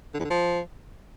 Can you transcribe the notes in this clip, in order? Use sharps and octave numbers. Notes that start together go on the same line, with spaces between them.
D3
E2
D3
F3